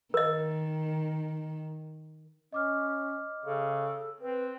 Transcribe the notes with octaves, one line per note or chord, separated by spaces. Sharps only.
D#3 A#4 D#5
C#4 D#5 D6 F6
C#3 A4
C4 B4